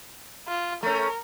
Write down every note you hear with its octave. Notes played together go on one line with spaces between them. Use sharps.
F4
A3 C#4 A#4